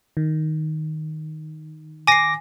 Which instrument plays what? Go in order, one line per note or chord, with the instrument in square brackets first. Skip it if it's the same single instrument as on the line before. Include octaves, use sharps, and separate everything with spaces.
[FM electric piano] D#3
[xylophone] G#5 C7 [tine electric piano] D6 A#6